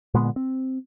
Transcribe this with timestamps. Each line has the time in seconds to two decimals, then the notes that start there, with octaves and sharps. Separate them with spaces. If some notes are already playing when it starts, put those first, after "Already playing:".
0.14 A#2 D3 G#3 B3
0.36 C4